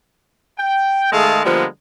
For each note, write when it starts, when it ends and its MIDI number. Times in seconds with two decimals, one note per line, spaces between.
0.59 1.08 79
1.12 1.43 51
1.12 1.43 56
1.12 1.43 57
1.12 1.43 68
1.12 1.43 77
1.12 1.43 81
1.45 1.65 50
1.45 1.65 53
1.45 1.65 55
1.45 1.65 56
1.45 1.65 58
1.45 1.65 59